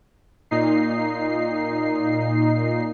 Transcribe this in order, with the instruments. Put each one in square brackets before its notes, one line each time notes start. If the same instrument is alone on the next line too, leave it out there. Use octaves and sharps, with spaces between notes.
[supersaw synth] A#2 D#4 C7